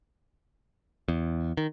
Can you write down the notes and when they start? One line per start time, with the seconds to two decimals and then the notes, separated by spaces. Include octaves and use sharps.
1.08 E2
1.57 D#3